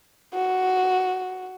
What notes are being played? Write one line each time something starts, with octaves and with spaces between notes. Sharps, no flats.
F#4